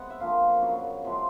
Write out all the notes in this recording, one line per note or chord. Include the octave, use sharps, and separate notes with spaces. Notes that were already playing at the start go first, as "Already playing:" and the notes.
Already playing: C3 G#3 B3 F#5
E5
D3 F3 A#3 F5
F#2 C#3 F#3 B3
C3 F3 G#3 C4